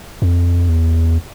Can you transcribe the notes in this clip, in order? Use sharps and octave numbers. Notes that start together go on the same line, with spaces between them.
F2
E2